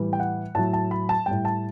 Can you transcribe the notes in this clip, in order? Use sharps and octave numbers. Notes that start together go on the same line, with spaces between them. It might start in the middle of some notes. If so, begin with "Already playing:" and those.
Already playing: A2 E3 G3
G5
F#5
A2 F#3 A5
A5
B5
A5
A2 G3 G5
A5